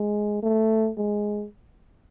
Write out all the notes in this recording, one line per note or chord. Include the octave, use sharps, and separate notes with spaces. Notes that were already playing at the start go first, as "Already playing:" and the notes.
Already playing: G#3
A3
G#3